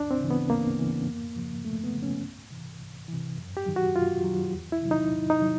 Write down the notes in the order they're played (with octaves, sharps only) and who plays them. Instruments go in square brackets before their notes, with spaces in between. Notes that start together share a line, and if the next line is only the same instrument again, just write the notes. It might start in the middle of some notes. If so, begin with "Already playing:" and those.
Already playing: [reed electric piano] D2 D4
C4
C#3 E3
B3
D2 A#3
C#3 E3
F2
C#3 F3
F2 A3
B3
C#3 F3
C#4
C2
C3 E3
C2
E3
C3
F#2
G4
D#3 F#3
F#4
F#2 F4
D#3 F#3
E2
E4
C3 D#3 F#3
D#4
E2
D#4
C3 D#3 F#3